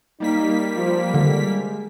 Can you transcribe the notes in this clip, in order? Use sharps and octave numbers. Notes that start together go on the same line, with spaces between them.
G3 A#3 D#4 B6
F3
D3 G#3